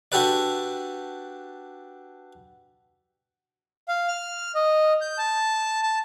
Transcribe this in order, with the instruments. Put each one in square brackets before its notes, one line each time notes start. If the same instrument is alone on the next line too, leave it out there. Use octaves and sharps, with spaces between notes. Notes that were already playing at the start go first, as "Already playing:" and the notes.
[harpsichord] D4 F#4 G4 A4 B4 D5
[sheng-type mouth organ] F5
F6
D#5
G6
A5
A5